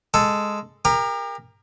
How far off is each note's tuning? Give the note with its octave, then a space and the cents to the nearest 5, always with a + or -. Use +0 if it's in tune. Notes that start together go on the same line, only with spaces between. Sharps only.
G#3 +0 A4 +0
G4 +40 A#4 +0